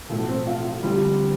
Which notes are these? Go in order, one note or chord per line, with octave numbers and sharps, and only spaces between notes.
B1 A2 F3 A3
C4
F4
F4
D2 D3 F3 G3 C4 F4